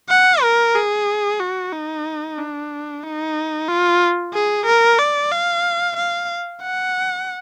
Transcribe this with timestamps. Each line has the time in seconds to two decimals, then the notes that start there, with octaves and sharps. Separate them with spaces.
0.09 F#5
0.42 A#4
0.75 G#4
1.40 F#4
1.72 D#4
2.38 D4
3.03 D#4
3.69 F4
4.33 G#4
4.66 A#4
4.99 D5
5.31 F5
5.97 F5
6.62 F#5